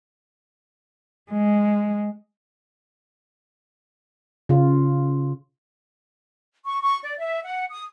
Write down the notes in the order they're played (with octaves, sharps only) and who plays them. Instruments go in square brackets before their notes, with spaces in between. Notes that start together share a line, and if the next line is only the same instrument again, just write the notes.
[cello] G#3
[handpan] C#3 F4
[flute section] C#6
C#6
D5
E5
F#5
D#6